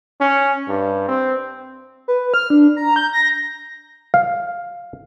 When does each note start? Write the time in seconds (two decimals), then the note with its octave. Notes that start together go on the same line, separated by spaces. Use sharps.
0.21 C#4
0.68 G2
1.08 C4
2.08 B4
2.34 F6
2.50 D4
2.76 A#5
2.96 G6
3.13 A#6
4.14 F5